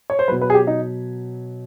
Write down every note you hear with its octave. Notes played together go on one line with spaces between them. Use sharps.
C#5
C5
B2 F#3 B4
B4
G#4
G4
D#4